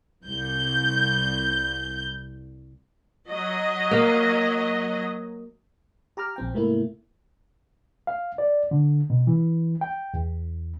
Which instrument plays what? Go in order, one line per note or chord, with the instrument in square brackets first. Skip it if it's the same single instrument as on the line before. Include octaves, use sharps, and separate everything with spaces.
[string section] C2 G6
[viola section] F#3 D#5
[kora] A#3 F5
[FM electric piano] G4 A#5 D6 F6
A#1 C4 G5
G#2 C3 A3 A#3 E4
[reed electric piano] F5
D5
D3
B2
E3
G5
E2